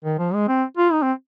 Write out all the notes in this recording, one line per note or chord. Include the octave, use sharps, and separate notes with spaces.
D#3
F3
G#3
C4
F4
D#4
C4